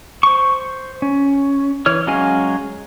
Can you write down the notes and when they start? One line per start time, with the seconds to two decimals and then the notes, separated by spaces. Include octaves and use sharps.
0.23 C5 C#6
1.02 C#4
1.86 E3 C#5 F6
2.07 F#3 G#3 C#4 F5 G#5